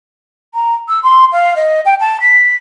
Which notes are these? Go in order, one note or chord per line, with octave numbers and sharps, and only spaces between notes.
A#5
E6
C6
F5
D#5
G5
A5
B6